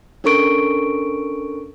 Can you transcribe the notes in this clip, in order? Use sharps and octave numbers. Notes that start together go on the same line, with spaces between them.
C#4 D4 A4 A#4 C#6 D7